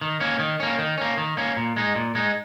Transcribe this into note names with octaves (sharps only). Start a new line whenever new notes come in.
D#3
A#3 C#4
D#3
A#3 C#4
D#3
A#3 C#4
D#3
A#3 C#4
A#2
G#3 D#4
A#2
G#3 D#4